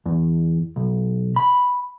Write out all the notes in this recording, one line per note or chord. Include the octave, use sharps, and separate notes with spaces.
E2
B1
B5